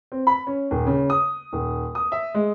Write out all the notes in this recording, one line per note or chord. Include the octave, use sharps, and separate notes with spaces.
C4
B5
C#4
D#1
C#3
D#6
D#1
D#6
E5
G#3